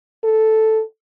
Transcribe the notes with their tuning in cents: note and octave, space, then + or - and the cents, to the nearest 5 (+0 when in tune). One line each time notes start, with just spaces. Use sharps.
A4 +0